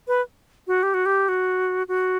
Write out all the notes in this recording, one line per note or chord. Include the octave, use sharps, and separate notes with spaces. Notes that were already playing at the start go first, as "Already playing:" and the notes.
B4
F#4
G4
F#4
G4
F#4
F#4